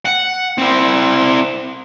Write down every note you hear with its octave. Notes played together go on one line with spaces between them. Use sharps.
F#5
C4 E4